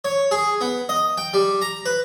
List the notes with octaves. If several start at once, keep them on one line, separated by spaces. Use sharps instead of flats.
C#5
G#4
B3
D#5
G5
G3
A#5
B4